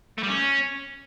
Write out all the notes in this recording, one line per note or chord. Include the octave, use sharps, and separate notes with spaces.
A3
G3
C#4